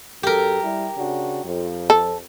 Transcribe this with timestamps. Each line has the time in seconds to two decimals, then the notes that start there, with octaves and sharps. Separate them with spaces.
0.23 F#2 G4 A4 A#4
0.63 G3 E4
0.97 C#3 D4 F#4
1.44 F2
1.90 A4